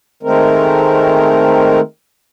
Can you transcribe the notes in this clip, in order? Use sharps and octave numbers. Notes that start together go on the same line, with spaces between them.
D#3 G#3 A3 C4 A#4